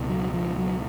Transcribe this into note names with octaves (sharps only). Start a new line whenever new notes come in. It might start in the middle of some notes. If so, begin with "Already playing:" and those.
Already playing: C#2 B2
F#3
F3
F#3